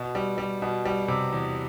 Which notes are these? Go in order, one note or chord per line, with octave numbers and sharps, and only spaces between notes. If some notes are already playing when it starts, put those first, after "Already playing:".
Already playing: B2
G3
G3
B2
G3
C3
E2